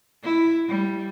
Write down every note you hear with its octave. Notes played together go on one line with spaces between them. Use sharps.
E4
G3